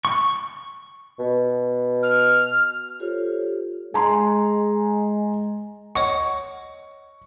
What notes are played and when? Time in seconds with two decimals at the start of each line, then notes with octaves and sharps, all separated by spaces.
0.05 C#6
1.19 B2
2.03 F6
3.00 F4 G4 A4 C5 C#5
3.94 G#3 G#5 A#5 C6
5.95 C#5 D#5 F#5 C#6